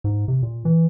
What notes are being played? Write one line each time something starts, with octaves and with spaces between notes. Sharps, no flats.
G#2
C3
A#2
E3